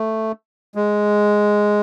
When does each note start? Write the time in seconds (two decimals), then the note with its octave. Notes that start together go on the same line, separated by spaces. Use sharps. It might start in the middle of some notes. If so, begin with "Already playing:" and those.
Already playing: A3
0.75 G#3